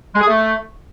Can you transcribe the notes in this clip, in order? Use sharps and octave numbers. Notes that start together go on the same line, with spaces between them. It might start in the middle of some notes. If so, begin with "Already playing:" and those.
G#3
G#4
A3